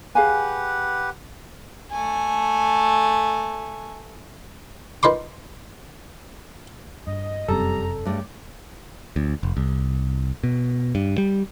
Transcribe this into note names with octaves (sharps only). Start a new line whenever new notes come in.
G4 G#4 B4 F5 F#5 G#5
A3 G#5
D#3 B4 C6 D6
G2 D#5
F1 F#2 G3 C4 A4 A#5
G2 A3 G#4 C#5 D5
D2
F1
C2
B2
G2
G3